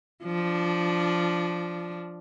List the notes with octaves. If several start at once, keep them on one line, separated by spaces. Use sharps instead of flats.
F3 D4